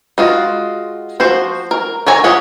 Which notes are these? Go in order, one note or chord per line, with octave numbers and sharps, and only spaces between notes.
G#3 F4 F#4
F3 F#4 C5
A#4
A#4 C#5 G#5 A#5
F4 G4 G#4 C#5 F#5